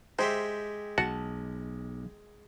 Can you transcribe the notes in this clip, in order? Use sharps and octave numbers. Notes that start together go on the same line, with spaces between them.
G#3 G4 C5 E5
B1 F#4 A5